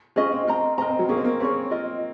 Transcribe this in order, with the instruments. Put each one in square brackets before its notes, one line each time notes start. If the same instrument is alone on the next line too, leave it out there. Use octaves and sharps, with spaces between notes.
[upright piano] C4 [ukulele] C#4 F4 G#4 D#5
[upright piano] C4
[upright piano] C4 [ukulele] A#4 D#5 A#5
[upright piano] C4 [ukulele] A#4 D#5 A#5
[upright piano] C4
F#3
[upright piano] A#3 [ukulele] C#4 G#4 C#5
[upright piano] C4
A#3
[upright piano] C4 [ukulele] C#4 G#4 C#5
[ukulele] F4 A#4 D#5